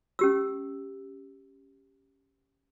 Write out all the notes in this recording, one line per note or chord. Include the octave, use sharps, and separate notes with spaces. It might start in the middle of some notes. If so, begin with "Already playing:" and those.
C#4 G4 E6